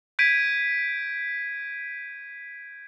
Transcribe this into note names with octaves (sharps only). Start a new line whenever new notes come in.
G6 G#6 B6 D7 D#7